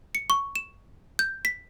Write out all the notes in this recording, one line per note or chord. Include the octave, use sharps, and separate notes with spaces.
C#7
C#6
E7
G6
B6